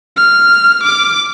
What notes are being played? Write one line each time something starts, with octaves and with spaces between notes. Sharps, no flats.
F6
D6